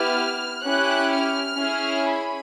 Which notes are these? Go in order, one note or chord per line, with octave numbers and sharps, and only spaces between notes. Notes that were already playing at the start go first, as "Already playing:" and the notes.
Already playing: B3 E4 G4 F6
C#4 E4 G4 F#6
F6
C#4 E4 G#4
B5